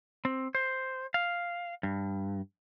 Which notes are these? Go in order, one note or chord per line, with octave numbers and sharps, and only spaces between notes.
C4
C5
F5
G2